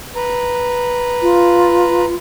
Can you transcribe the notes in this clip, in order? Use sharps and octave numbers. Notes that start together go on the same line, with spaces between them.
B4 A#5
F4